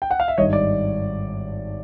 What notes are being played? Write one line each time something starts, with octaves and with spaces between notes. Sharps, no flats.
G5
F#5
F5
E5
G#1 G2 D#3 C#5 D#5
D5